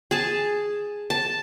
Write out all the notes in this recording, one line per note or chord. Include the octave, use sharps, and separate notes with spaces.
G#4 A5
A5